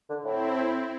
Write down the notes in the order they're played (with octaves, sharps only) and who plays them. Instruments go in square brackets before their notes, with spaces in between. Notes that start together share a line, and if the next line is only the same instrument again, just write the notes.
[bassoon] D3
[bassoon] A2 [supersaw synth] C4 E4